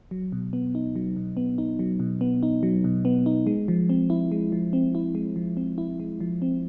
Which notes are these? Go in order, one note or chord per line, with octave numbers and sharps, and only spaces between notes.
F#3
B2
B3
D#4
F#3
B2
B3
D#4
F#3
B2
B3
D#4
F#3
B2
B3
D#4
G#3
F3
C4
E4
G#3
F3
C4
E4
G#3
F3
C4
E4
G#3
F3
C4